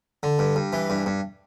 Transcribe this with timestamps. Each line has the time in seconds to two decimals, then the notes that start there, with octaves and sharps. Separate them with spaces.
0.23 D3
0.39 G2
0.56 G2
0.73 E3
0.90 G2
1.06 G2